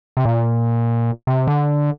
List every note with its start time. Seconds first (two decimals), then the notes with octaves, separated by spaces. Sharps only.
0.17 C3
0.25 A#2
1.27 C3
1.47 D3